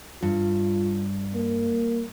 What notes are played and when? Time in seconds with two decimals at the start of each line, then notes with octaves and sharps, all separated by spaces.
0.22 G2 F4
1.34 A#3